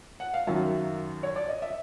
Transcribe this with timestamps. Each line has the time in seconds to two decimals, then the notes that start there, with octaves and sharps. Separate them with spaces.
0.20 F#5
0.34 F5
0.47 F#2 D#3 F#3 E5
1.23 C#5
1.36 D5
1.49 D#5
1.62 E5